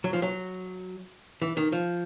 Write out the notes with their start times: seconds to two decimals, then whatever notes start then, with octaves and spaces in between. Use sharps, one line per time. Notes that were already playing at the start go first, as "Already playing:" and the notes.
0.04 F#3
0.13 F3
0.22 F#3
1.42 E3
1.57 D#3
1.72 F3